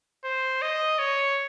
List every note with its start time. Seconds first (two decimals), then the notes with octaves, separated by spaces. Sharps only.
0.24 C5
0.62 D#5
0.99 C#5